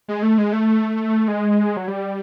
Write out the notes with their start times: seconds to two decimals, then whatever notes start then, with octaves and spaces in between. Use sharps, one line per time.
0.08 G#3
0.22 A3
0.38 G#3
0.53 A3
1.28 G#3
1.77 F#3
1.88 G3